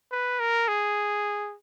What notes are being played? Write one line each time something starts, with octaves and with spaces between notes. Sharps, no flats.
B4
A#4
G#4